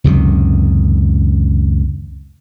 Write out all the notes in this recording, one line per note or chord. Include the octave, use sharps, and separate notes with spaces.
C#2 F#2 C3 D#3